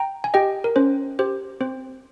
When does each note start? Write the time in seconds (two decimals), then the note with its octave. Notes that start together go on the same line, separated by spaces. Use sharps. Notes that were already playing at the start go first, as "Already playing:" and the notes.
Already playing: G5 A#5
0.24 G#5
0.34 G4 D#5 G5
0.64 A#4
0.76 C#4 C5
1.19 G4 C5
1.61 C4 C5